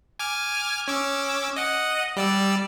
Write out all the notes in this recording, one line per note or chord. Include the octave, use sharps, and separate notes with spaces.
G#5 D6 F6
C#4 D6 E6
D#5 F#5
G3 D5 E6